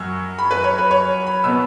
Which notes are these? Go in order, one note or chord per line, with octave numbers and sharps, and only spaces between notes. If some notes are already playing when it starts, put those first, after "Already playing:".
Already playing: F#2 F#3 C#6 E6
B5
B4
C#5
B4
C#5
B5
B2 B3 E6